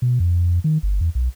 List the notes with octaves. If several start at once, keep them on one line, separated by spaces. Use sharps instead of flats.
B2
F2
D#3
G1
E2
B1